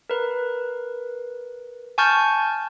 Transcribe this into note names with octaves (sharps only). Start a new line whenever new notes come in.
A#4 B4
G#5 A5 C#6 F6 G6 A6